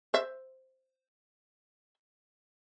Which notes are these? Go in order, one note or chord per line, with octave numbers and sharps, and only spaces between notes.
C5 E5